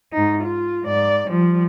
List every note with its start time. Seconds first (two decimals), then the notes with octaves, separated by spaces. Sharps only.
0.13 G#2 D#4
0.44 F4
0.84 G#2 D5
1.28 F3 G3